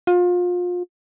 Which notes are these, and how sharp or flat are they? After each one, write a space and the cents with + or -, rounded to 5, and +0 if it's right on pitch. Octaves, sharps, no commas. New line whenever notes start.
F4 +30